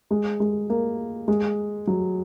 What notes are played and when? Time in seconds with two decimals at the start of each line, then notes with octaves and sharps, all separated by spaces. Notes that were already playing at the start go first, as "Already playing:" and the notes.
0.11 G#3
0.40 G#3
0.70 A#3
1.28 G#3
1.87 F#3